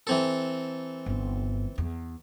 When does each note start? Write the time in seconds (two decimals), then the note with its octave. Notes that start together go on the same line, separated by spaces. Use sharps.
0.07 E3 C4 A4
1.06 G1 G2
1.78 E2